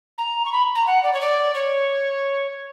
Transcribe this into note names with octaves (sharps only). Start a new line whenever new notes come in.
A#5
C#6
B5
A#5
F#5
D5
C#5
D5
C#5